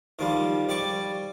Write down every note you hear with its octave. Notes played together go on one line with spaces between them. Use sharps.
D#3 F3 G3
G3 D5 C#6